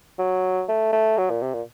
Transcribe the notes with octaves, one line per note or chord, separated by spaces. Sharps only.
F#3
A3
A3
F#3
A#2
C3
A#2